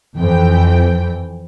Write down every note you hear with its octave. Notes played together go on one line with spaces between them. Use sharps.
F2 E3 G5